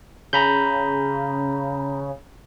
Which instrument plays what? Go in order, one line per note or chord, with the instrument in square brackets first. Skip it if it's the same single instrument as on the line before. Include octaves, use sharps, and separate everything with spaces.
[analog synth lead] C#3 [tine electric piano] A#5 B5 G6